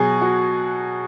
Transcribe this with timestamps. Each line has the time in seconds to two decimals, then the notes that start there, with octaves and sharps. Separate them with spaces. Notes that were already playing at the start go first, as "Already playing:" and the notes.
Already playing: B2 F#3 G#4
0.22 F#4